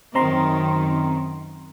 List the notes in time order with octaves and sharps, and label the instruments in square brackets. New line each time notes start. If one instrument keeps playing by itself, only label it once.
[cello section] F#2 D#3 [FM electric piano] C4 A#5 C6